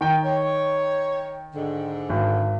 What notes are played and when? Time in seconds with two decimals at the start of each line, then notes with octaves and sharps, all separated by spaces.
0.01 D#3 G5
0.24 C#5
1.54 G#2 D3
2.09 G#1